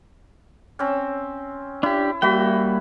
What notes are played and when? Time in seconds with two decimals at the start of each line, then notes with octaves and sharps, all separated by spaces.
0.79 C4 C#4
1.83 D4 E4 G4
2.22 G3 A#3 F#4 E5 G5 B5